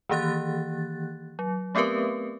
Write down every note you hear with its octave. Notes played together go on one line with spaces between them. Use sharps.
D#3 E3 A#3 G4 F#6 A6
F#3
A3 B3 C4 G4 A#4 B4